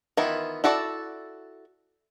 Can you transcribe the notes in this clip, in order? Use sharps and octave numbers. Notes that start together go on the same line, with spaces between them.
D#3 E3 B3 E4 F4
E4 F#4 A4 D5